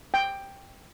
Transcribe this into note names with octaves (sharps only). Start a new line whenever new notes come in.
G5